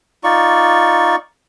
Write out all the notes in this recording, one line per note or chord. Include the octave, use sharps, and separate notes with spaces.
D#4 F4 D5 C#6